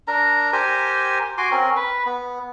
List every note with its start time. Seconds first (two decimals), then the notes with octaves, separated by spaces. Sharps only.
0.08 D4 A#4 A#5
0.53 G4 A#4 C5 G#5
1.38 F#4 G#5 C6 D6
1.51 C4 C#4 A#4
1.76 B4
2.06 B3